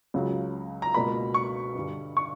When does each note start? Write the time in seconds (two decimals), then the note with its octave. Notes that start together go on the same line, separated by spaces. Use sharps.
0.14 C#2 C#3 F#3
0.82 A#5
0.94 C#2 B2 A#3 B5
1.34 C#6
1.75 G2 D3 G3
2.17 C#6